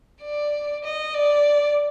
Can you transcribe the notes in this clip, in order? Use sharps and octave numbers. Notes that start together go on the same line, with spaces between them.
D5
D#5
D5